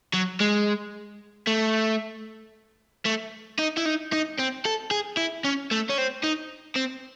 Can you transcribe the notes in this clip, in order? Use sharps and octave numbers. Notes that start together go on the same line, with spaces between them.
F#3
G#3
A3
A3
D#4
E4
D#4
D#4
C4
A4
G#4
E4
C#4
A3
C#4
C4
D#4
C4